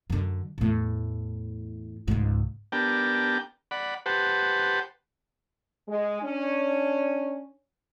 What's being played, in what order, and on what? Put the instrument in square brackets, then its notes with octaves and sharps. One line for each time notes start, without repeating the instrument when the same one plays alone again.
[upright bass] F#2 D3
E2 A2
C#2 G#2
[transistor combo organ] B3 D4 G4 A#4 G5 A5
D5 F#5 B5
G4 B4 C5 F#5 A5
[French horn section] G#3
C#4 D4